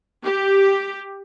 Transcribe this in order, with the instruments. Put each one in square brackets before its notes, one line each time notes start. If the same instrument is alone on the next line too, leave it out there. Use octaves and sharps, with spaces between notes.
[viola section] G4